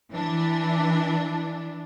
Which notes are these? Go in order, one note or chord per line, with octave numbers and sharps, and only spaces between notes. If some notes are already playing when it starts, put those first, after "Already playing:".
E3 D4